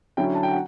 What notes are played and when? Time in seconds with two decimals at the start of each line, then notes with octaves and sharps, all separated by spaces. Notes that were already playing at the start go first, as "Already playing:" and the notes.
0.17 D3 F#3 C#4 E4 G5
0.35 A5
0.43 G5
0.51 F#5